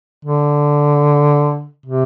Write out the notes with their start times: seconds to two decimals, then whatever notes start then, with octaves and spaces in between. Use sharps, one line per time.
0.25 D3
1.86 C3